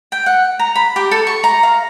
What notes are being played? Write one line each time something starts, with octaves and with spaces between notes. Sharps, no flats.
G5
F#5
A#5
B5
G4
A4
C#6
A#5
F5